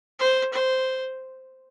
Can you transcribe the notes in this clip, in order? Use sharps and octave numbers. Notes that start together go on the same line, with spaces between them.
C5
C5